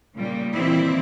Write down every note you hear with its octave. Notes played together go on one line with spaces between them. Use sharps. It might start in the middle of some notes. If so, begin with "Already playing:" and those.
A#2 C#3 G3 A#3
A#2 D#3 E3 G3 C4 E4